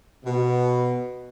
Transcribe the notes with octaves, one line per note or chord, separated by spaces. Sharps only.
B2